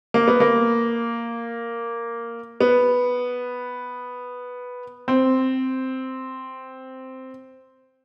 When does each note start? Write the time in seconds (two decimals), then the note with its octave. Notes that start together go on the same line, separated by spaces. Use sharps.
0.14 A#3
0.28 B3
0.40 A#3
2.60 B3
5.08 C4